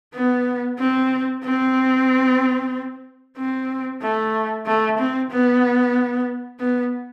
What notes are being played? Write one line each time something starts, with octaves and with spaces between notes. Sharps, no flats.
B3
C4
C4
C4
A3
A3
C4
B3
B3